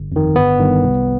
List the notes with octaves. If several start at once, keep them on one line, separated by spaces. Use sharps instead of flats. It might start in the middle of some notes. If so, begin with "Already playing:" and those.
Already playing: G1
F2 D#3
G1 B3
G2 D#3
C2